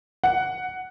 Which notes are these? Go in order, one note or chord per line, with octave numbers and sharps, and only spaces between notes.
F#5